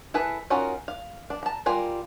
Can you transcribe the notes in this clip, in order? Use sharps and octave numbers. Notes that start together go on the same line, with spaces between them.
E4 G#4 A4 B4
C#4 D#4 F4 F#4 A#4
F5
D4
A5 A#5
G3 F4 A#4 G#5